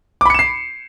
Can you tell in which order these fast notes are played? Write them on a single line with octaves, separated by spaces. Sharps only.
D6 B5 C#7 E7 C7